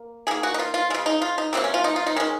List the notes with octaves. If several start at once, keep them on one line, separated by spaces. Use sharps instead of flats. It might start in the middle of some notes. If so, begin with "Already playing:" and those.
Already playing: A#3
D#3 A#3 G#4
F#4
D#4
F4
F4
C#3 G#3 F4
D#4
F4
D#4
C3 F#3 A#3 C4
C#4
F4
D#4
F4
D#4
D#3 G#3 C#4